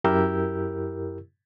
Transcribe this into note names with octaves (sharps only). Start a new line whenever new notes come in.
F#2 E4 G4 A#4 E6 G6